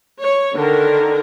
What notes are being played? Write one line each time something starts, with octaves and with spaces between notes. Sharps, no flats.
C#5
D3 D#3 A#4